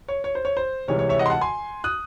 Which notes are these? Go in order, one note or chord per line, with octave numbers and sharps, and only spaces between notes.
C#5
C#5
C5
C#5
C5
C2 C3 E3 G#3 C#5
C#5
C#5 E5
D#5 F#5
C6
F#5 A5
G#5 C6
D#6 F#6